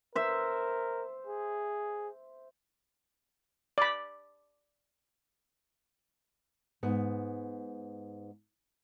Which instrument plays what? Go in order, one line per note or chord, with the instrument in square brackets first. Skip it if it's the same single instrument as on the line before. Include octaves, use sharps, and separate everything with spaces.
[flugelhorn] A#4 [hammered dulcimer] C5 E5
[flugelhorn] G#4
[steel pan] D5 B5
[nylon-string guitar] G#2 B3